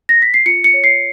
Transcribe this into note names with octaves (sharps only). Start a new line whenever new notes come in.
A#6
B6
C7
F4 C#7
C#7
C#5
C7